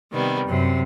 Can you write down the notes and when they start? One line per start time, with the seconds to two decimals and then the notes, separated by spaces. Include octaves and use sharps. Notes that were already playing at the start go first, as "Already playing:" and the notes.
0.12 C3 D#3 G3 B3
0.47 F#2 C3